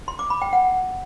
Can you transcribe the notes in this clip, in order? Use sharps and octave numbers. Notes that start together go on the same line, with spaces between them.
C6
D6
B5
G5
F#5